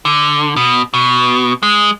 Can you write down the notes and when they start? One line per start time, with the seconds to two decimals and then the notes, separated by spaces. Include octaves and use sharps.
0.05 D3
0.56 B2
0.94 B2
1.63 G#3